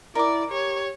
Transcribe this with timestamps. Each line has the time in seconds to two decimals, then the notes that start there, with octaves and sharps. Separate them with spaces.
0.15 E4 A#4 D5 D6
0.51 G4 C#5